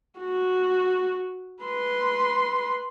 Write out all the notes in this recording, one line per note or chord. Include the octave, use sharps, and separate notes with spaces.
F#4
B4 C6